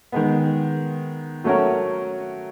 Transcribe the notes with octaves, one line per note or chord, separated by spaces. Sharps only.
D#3 G#3 B3
F#3 A3 C#4 F#4 A#4